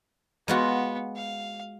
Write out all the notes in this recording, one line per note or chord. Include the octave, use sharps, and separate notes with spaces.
G#3 B3 F4 F#4
F5